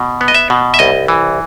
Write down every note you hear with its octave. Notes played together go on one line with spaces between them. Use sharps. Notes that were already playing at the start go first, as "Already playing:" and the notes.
Already playing: B2
B3
D#5
E5
B2
E5
C2 D#5
E3